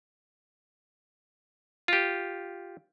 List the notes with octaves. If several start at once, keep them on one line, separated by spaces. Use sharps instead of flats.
F4 G4